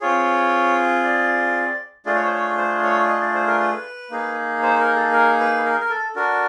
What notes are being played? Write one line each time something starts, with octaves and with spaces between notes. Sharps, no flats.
C4 F4 G#4 C#5
D5
A3 D4 F4 G#4 D5
C#5
C5
C#5
C5
C#5
D#5
D5
C5
A#4
B4
A#3 D#4 G#4
C5
A#4
A4
A#4
B4
A#4
A#4
A4
D4 F#4 A4 A#4